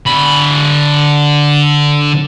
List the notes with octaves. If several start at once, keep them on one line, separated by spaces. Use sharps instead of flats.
D3 B5